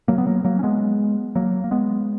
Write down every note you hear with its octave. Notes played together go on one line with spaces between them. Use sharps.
F#3 A#3
B3
F#3 A#3
F#3 A#3
C#4
G#3 B3
F#3 A#3
A#3
G#3 B3